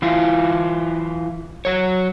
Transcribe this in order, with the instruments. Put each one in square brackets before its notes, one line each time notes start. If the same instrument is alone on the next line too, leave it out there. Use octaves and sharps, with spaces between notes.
[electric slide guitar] E3 E4 F4
F#3 C#5